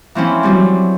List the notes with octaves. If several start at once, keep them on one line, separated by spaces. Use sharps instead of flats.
E3 F3 C4 C#4 E4
F#3 G3 C4